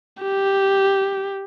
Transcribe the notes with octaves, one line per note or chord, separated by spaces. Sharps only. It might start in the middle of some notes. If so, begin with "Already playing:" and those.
G4